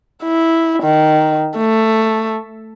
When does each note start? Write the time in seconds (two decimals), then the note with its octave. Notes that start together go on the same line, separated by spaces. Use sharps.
0.23 E4
0.83 D#3
1.57 A3